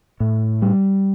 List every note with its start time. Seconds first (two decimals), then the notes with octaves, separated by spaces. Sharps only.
0.20 A2
0.62 G3